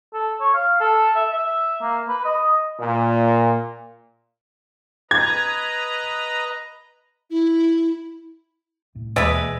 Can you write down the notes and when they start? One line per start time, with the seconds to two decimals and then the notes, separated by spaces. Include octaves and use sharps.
0.14 A4
0.40 C#5
0.54 F5
0.80 A4
1.16 E5
1.32 E5
1.82 A#3
2.09 B4
2.25 D#5
2.78 A#2
5.11 B4 D#5 A#5 G#6
7.30 E4
8.95 C2 A2
9.16 D#2 B2 E3 G#3 B4 D5 E5